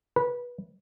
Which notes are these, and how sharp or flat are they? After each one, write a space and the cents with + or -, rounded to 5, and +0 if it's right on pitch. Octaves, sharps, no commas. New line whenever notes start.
B4 -20